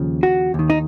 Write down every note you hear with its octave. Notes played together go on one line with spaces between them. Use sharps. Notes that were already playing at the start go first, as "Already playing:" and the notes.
Already playing: D#2 C#3 F3
F#4
D#2 D#3
D#4